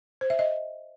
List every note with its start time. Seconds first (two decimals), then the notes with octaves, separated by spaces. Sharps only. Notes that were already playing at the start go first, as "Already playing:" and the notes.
0.21 C5
0.30 E5
0.39 D#5